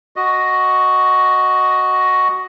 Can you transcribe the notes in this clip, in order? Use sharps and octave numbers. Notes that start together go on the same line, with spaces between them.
F#4 D#5